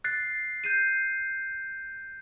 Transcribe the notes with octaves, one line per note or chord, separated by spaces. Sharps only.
F#6 A6 C7
G6 C7 D#7